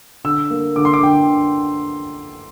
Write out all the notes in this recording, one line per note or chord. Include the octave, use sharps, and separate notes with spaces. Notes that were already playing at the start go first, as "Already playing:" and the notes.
D3 E6
A#3
D3 D6
C6
D6
D3 G5